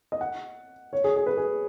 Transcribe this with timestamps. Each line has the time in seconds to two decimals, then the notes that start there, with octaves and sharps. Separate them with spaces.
0.12 D#5
0.21 F#5
0.93 C#5
1.04 G#4
1.16 G#4
1.26 B4
1.37 G#4